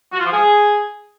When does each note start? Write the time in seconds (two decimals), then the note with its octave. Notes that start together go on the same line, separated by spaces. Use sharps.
0.12 F#4
0.19 F4
0.26 F3
0.32 G#4